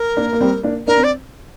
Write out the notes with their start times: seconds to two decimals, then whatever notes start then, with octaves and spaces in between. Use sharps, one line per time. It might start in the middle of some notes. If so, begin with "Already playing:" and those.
Already playing: A#4
0.17 A#3 D4
0.33 A#3
0.41 G3 C4
0.63 A#3 D4
0.87 D4 A#4
0.98 C4
1.03 D5